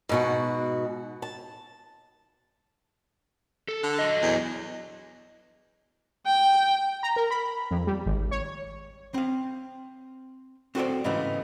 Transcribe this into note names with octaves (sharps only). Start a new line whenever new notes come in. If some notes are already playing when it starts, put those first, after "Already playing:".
G#2 B2 F#4
A5
A4
D3
F#3 D#5
E2
G5
A#5
A#4
B5
F2
G3
G#1
C#5
C4 F5
C4 F#4 A4 B4 C5 D5
G#2 C#3 E3 A3 B3